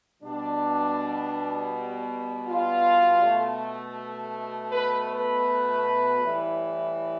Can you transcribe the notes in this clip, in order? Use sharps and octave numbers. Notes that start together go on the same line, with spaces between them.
B2 G3 D4
F4
B2 A3
B4
B4
A2 E3 G3